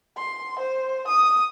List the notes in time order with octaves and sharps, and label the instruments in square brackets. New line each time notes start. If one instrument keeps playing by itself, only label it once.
[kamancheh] C6
C5
D#6